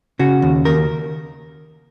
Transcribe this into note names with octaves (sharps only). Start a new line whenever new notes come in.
C#3 F#4
D#2
D#2 A#4